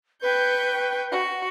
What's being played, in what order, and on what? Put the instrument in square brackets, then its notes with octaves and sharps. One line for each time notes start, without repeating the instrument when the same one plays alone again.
[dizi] B4 [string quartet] G5 C#6 G6
[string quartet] F#4